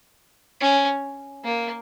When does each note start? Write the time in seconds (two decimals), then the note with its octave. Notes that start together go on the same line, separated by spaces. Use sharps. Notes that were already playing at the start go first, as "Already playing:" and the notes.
0.61 C#4
1.44 A#3